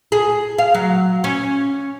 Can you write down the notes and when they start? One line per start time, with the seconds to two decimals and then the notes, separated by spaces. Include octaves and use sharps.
0.12 G#4
0.58 F5
0.75 F#3
1.24 C#4